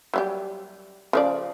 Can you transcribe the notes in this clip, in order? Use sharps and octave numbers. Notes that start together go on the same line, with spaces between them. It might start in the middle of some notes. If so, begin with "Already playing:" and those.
F#3 G3 G4
C#3 F3 D5